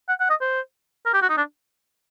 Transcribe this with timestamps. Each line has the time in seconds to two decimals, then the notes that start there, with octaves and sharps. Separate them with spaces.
0.09 F#5
0.20 F#5
0.30 D#5
0.41 C5
1.06 A#4
1.14 G4
1.22 F#4
1.29 D#4
1.37 D4